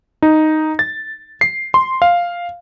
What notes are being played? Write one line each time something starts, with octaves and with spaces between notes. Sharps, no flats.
D#4
A6
C7
C6
F5